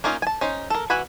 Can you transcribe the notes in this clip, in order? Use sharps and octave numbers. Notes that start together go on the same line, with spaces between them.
A#3 C#4 D#4 F4 D#5
G#5 A5
C#4 D#4 C5
A4 A#4
E3 F#4 F#5 G#5 B5